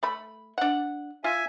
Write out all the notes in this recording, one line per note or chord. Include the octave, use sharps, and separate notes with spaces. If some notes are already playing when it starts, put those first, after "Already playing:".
A3 B5
D4 F#5
F4 E5 G#5